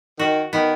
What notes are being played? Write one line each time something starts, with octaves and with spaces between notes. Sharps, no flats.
D#3 F#4
D#3 B3